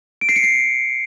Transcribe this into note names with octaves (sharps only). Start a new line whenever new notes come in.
D7
C7
C#7
C7